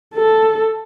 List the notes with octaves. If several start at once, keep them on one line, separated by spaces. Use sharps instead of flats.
A4